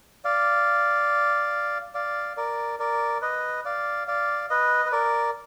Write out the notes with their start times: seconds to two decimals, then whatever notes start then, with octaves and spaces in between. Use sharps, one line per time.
0.25 D5 F5
1.94 D5 F5
2.37 A#4 D5
2.79 A#4 D5
3.22 B4 D#5
3.65 D5 F5
4.08 D5 F5
4.50 B4 D#5
4.86 B4
4.92 A#4 D5